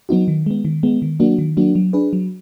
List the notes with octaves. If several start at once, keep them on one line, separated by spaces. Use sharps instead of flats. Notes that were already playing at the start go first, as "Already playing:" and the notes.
F#3 B3 D#4 F#4
D#3
G#3 B3
D#3
G#3 B3
D#3
F#3 A#3 D4 F#4
D#3
F#3 A#3 D4 F#4
F#3
D4 G#4 B4
F#3